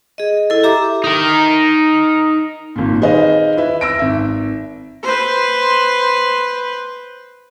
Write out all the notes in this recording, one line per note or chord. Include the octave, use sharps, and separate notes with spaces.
G#4 D#5
E4 A4
G4 E5 A#5 D6
D#4 A#4
G#1 A#2
D#3 G#4 B4 C5 D#5 F5
E4 B4 E5
E6 A#6 D7
G#1 E5
B4 C5